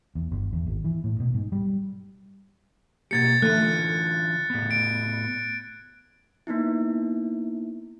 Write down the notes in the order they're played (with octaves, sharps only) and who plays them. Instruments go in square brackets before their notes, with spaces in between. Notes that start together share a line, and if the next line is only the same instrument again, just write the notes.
[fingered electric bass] E2
G1
E2
G#1
E3
A2
B2
G#2
G3
[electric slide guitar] B2 A#3 G4 [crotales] G#6 A6 C#7
[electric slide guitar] D3 E3 F4 [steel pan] A3 [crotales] F#6
[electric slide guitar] A2 B3
[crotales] D7
[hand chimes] A#3 B3 D#4 E4